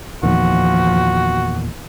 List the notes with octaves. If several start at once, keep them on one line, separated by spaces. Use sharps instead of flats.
E2 A#2 D#3 F3 F#4